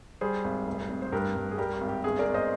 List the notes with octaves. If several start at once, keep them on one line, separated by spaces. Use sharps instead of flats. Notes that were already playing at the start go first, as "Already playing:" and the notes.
G3 G#4 C5
G#1
F1
F1
C5
G2 G4 A#4
G2
G#4
G3 G4 A#4
G4
G#1
G4
G1 G#4
A#4 D5
G1
C5 D#5